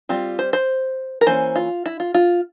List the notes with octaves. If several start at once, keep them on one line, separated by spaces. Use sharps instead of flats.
G3 C4 F4
C5
C5
A#4
E3 A#3 C#4 C5
F4
E4
F4
F4